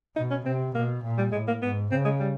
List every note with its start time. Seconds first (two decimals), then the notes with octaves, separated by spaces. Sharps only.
0.16 B2 D#4
0.31 C#4
0.45 C3 C4
0.74 B2 A#3
1.04 A#2
1.18 G3
1.32 A2 G#3
1.48 A#3
1.62 G#2 B3
1.91 C#3 C4
2.05 G#3
2.19 G3